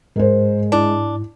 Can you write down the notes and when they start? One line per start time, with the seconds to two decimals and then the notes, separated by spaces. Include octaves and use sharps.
0.16 G#2 G#3 A#4 C5
0.72 D4 E4